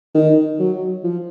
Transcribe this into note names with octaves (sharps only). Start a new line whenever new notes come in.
D#3
F#3
F3